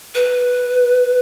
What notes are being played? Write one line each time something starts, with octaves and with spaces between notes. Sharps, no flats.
B4